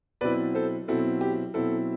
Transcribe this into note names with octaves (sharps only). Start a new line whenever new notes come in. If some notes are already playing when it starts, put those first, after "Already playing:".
B2 F#3 C4 E4 B4 D5
A4 C5
B2 F#3 C4 E4 A4
G4
B2 F#3 C4 E4 A4